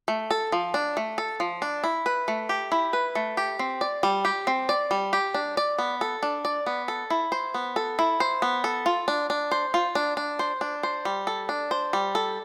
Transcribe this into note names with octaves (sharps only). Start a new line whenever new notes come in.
A3
A4
F3
D4
A3
A4
F3
D4
E4
B4
A3
G4
E4
B4
A3
G4
C4
D5
G3
G4
C4
D5
G3
G4
D4
D5
B3
A4
D4
D5
B3
A4
E4
C5
B3
A4
E4
C5
B3
A4
F4
D4
D4
C5
F4
D4
D4
C5
D4
C5
G3
A4
D4
C5
G3
A4